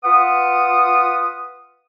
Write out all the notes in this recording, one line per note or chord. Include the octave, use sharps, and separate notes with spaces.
F4 B4 F#5 D#6